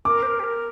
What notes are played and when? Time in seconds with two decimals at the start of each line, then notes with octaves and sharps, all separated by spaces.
0.05 A#4 D6
0.22 C5
0.27 A#4
0.39 G4
0.44 A#4